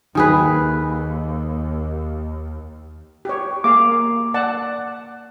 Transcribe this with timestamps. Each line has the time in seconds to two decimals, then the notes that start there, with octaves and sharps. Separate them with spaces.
0.15 D#2 D#3 G#4 B4
3.25 G4 C#5
3.64 A#3 G#4 F5 D6
4.34 D5 F#5 A5